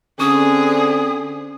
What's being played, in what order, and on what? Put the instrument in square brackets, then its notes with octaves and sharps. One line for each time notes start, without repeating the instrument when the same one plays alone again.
[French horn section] D3 C4 [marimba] C#4 G#5 [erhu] G#4 [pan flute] D#6